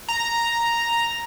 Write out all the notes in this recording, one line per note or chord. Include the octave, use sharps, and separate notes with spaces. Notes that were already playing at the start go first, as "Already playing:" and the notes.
A#5